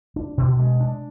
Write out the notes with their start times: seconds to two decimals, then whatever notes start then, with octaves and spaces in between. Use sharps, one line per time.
0.16 D4
0.38 B2
0.59 G#3
0.80 D4